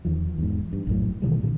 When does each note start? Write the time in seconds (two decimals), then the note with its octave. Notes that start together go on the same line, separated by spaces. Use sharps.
0.05 E2 D#3 F3
0.38 E2 G#2
0.73 G2
0.87 A#1 F#2 A2
1.22 B2 D#3 E3 G3
1.43 A#2 D3